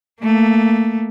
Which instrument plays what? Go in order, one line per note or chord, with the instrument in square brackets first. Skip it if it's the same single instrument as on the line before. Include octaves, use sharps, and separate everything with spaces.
[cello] A3 A#3